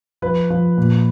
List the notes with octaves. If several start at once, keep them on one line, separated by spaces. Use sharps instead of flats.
F3 B4
F3
A#2